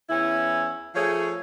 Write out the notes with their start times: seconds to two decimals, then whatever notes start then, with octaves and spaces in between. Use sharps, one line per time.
0.10 E2 C#4 E4
0.95 F3 A3 G#4 C#5